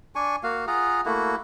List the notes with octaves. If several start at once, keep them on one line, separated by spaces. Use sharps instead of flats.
D4 G#5 C#6
A#3 F#4 F5
F4 G#4 F#5 A#5
A3 A#3 E4 F#4